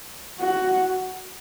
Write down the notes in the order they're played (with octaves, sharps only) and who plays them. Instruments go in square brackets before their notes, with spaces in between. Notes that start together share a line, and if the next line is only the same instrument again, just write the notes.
[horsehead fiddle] F#4